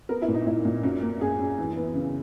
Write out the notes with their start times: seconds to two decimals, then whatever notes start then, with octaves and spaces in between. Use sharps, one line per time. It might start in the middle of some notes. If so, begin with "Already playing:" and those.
0.09 B3 A#4
0.22 E4
0.28 A#2
0.34 D#4
0.46 A#2 E4
0.65 A#2
0.83 F#2 F#4
1.02 A#3
1.21 F#2 G#4
1.39 F#2
1.59 E3
1.77 B3
1.95 C#3